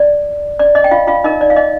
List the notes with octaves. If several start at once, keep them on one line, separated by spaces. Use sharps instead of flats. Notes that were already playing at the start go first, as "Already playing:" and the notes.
Already playing: D5
D5
D#5
G5
F4 F5
F4 F5
D#4 A#4 D#5
D5
F5
D#5